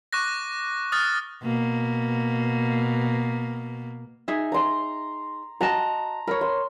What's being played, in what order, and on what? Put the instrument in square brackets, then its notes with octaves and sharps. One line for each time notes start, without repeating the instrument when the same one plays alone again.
[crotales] C#6 D6 F#6 A#6
D#6 F6 F#6 A6
[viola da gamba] B2 A#3
[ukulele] D#4 G#4 E5
[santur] A#5 C6
[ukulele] F#4 D#5 A5 [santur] A#5
[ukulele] A#4 C#5 [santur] B5
[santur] C6